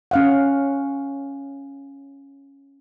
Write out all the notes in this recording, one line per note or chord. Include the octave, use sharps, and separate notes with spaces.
C#4 F5 F#5